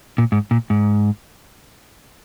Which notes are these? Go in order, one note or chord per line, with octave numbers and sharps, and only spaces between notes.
A#2
G#2
A#2
G#2